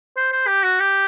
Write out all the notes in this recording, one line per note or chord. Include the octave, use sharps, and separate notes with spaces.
C5
C5
G4
F#4
G4